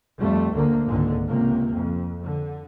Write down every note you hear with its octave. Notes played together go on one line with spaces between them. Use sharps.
F2 G3 A3
D2 D3 A3 A#3
G#1 C#2 A#2 D3 G#3
C#2 C3 A#3
F2
D3